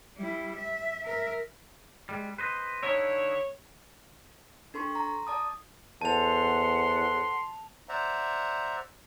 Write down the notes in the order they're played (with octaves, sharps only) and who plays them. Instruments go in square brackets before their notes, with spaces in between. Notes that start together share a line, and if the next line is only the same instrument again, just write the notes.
[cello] G3 E4
E5
A#4 E5
[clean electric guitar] G3 G#3
B4 C5 D#5
[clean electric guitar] D3 D#4 E4 [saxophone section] C#5
[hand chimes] D4 A4 C6 C#6
A#5
D5 A5 D#6
[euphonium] E2 [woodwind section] A4 C5 F#5 [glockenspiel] A5 F7 [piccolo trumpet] C6
[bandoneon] C5 D5 E5 F#5 A#5